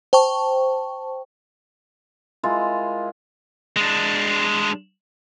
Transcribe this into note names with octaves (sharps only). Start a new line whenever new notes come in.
C5 G5 A5 C#6
G#3 E4 F4 A#4
G#3 D4